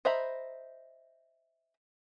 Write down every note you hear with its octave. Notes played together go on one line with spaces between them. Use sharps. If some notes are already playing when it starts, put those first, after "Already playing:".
C5 D#5 E5 A#5 B5